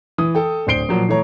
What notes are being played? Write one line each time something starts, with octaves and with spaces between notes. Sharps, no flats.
E3 D#6
A4 G5
D1 D4 C5 C7 D7 G7
A#2 F3 F#3
E3 A3 C#5 A#5